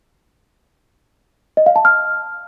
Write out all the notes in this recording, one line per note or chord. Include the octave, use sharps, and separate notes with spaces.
D#5
F5
A5
F6